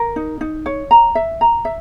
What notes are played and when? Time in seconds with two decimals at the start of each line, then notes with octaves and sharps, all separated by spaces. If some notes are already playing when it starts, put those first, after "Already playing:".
Already playing: A#4
0.16 D#4
0.41 D#4
0.66 C#5
0.91 A#5
1.15 E5
1.41 A#5
1.65 E5